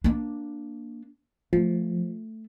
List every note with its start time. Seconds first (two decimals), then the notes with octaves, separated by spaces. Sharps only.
0.04 A#3 D4
1.53 F3 A3